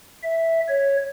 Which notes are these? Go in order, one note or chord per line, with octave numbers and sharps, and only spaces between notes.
E5
C#5